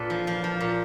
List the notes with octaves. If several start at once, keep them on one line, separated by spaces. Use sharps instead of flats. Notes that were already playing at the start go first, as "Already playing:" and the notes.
Already playing: A#2 A4 B4
F3
F3
F3
A#2